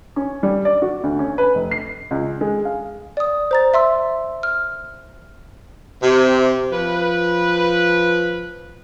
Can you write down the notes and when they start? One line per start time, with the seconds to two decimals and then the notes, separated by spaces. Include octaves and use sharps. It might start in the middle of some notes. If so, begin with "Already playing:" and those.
0.16 C#4
0.43 G3
0.65 D5
0.82 F#4
1.03 D2
1.19 C#4
1.38 B4
1.55 F1
1.71 C7
2.11 C#2
2.41 G#3
2.65 F5
3.17 D5 D#6
3.51 C5 A#5 A6
3.74 E5 C6 E6
4.43 F6
6.03 C3
6.72 F3 B4